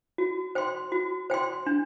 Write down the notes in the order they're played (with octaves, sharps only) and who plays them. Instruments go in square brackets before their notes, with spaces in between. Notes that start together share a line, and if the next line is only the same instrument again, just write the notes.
[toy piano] F#4
C5 G5 C6
F#4
C5 G5 C6
D4